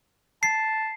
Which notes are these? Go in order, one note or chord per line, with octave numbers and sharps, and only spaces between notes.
A5 C7